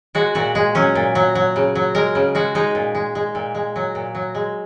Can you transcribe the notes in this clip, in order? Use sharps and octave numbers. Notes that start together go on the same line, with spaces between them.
G#3 F#4
A#2 F#4
G#3
F#3 C#4
A#2
F#3
F#3
C#3
F#3
G#3 A#4
C#3
G#3 F#4
G#3 D#4
A#2
G#3
G#3
A#2
G#3
F#3
A#2
F#3
G#3